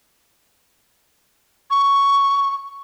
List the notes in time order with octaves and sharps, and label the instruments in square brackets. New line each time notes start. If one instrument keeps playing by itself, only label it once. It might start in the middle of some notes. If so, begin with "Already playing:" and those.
[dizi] C#6